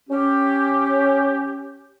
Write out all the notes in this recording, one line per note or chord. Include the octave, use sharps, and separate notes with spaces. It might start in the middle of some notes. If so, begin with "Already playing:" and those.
C#4 G4